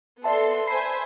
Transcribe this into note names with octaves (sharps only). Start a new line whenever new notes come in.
B3 A4 D5 E5 A5 C6
C5 E5 G#5 B5 C7